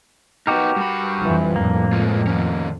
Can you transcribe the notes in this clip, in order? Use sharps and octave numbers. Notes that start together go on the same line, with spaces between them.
B3 D#4 F#4 G4 A#4
G2 B5
F2 E3 F3
F2 A2 A#3
G#3 F4
D#3 C#4